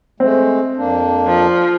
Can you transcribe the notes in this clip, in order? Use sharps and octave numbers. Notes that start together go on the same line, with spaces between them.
G#3 A3 C4
F2 A#3 D4
F3